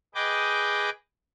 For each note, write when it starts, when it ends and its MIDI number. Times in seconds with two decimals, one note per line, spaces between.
0.15 0.90 68
0.15 0.90 71
0.15 0.90 75
0.15 0.90 79
0.15 0.90 86